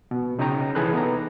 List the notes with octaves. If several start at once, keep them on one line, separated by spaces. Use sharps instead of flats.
B2
C#3 D#4 C#5 D#5 G5 A#5
C3 E3 G#4 A4 B5 F#6
B3 D#4 A#5